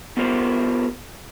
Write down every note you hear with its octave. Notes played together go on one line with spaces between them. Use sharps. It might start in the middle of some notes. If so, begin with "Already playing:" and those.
B3 F4 G4 A#4 C5